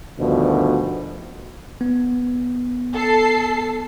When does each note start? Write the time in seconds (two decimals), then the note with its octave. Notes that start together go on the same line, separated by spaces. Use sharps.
0.19 D2 G2 B2 D#3 F3
1.81 B3
2.93 A4 C7